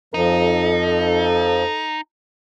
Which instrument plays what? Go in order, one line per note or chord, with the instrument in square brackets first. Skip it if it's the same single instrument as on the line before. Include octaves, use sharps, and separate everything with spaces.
[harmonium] F2 F3 [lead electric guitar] D#4 [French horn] A4